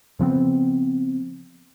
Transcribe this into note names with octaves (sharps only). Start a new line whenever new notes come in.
C#3 F3 B3 C4